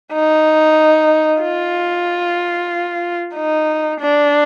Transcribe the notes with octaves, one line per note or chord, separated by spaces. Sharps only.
D#4
F4
D#4
D4